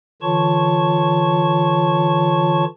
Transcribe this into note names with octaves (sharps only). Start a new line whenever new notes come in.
D3 E3 F4 C#5 A5 C#6